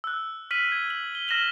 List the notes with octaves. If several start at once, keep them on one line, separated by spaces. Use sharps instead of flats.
E6 F#6
F6 B6 D#7 F#7
G#6
F#7
G7
F6 A#6 E7 F#7 G7